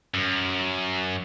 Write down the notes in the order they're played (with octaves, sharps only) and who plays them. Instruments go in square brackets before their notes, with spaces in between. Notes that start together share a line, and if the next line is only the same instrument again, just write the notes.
[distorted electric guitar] F#2